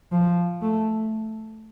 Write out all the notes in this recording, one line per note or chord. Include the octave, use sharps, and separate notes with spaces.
F3
A3